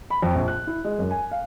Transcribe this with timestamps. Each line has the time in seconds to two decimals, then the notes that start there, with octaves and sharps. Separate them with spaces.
0.10 B5
0.22 F2
0.36 A#1
0.48 F#6
0.67 E4
0.84 G#3
0.99 F#2
1.11 G#5
1.31 F5